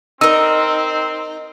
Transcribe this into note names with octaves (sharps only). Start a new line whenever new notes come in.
C4 D#4 A#4 D#5 E6